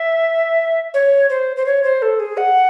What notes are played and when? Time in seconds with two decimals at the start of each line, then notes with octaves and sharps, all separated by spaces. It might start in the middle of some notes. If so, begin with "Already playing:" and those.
Already playing: E5
0.94 C#5
1.30 C5
1.56 C5
1.66 C#5
1.84 C5
2.02 A4
2.20 G#4
2.37 F#5